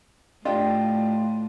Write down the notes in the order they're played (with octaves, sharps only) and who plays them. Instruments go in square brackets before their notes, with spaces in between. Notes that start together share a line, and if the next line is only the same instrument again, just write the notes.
[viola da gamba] A2 [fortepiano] D4 [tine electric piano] F4 [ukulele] G4 D#5